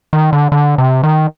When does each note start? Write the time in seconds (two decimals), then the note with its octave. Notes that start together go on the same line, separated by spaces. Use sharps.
0.13 D#3
0.33 D3
0.52 D3
0.78 C3
1.03 D#3